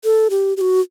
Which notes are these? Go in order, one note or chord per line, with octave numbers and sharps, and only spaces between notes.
A4
G4
G4
F#4